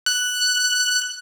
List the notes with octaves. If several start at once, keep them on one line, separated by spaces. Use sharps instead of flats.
F#6